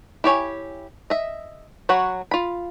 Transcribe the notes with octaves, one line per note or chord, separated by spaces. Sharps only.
E4 G4 C#5 G#5
D#5 E5
F#3 F#4 C#5 F#5 B5
F4 B5